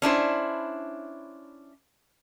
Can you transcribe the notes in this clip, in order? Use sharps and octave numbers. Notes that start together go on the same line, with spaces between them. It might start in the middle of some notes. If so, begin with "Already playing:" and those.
C#4 D4 E4 C5